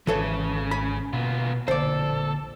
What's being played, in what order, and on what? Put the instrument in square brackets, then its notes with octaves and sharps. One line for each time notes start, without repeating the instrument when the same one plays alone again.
[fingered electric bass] G#1 [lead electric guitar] C#3 [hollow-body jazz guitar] E3 A4 C#5
[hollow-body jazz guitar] B5
[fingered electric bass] B2 A#3 [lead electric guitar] B3 F4
[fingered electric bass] A#1 D3 A#3 [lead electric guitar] A4 [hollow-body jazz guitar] C5 D5